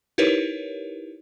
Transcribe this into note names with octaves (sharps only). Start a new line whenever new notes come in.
D#4 E4 G4 A#4 B4 C#5